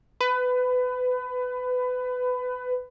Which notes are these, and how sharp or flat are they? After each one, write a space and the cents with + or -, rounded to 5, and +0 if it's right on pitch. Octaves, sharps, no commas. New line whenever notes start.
B4 +25